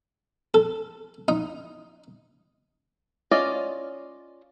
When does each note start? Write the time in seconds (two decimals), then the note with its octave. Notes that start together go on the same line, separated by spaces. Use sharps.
0.54 A4
1.28 D#4
3.31 C#4 F4 D5 D#5